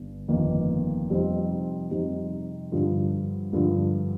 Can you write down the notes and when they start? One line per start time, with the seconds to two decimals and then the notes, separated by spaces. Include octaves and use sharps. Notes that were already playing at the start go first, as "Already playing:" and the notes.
Already playing: G1
0.28 G1 F2 D#3 A#3
1.10 F2 C3 G3 C4 D#4
1.91 F2 C3 G3 C4 D#4
2.72 G2 D3 F3
3.53 G2 D3 F3